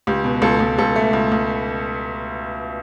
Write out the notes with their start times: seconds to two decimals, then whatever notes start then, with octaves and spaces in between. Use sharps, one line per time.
0.07 C#2 G4
0.24 B2
0.42 C#2 A4
0.60 C#2
0.78 C#2 A4
0.96 A3
1.13 C#2
1.32 C#2